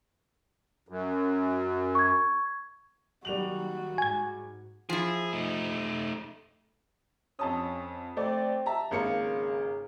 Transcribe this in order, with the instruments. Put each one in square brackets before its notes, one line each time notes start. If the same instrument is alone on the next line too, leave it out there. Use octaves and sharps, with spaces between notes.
[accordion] F#2
[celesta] C#6 G#6
[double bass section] D#3 F#3 A#3 [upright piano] G3 F7 F#7 [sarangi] F#4
[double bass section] G#2 [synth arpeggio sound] G#5 G#6
[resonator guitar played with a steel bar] F3 E4 [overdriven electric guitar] G#4
[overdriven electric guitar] A3 D#4
[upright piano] F2 A5 D#6 [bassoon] C#4
[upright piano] A3 D5 [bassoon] C4
[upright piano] E5 A5 A#5
[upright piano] G#1 A#3 C#7 [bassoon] C#3